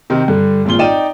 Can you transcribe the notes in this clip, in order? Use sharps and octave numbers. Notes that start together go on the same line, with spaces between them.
C3 D#3 C4
G2 D3
G#1 A#2 C4 F4 G7
D#4 D5 G5 D#7 E7